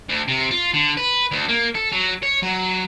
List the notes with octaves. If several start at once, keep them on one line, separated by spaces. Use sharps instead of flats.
D2
C3
F4
D3
B4
D2
A#3
A4
F#3
C#5
F#3